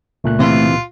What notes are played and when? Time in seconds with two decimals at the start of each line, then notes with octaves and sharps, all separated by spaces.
0.24 C#2 A#2 A3 F#6
0.40 C3 E3 F4